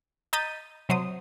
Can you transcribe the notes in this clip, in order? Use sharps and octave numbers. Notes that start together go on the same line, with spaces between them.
D#5 A#5 G6 A6 B6 D#7
C3 F#3 C5 C#5 D#6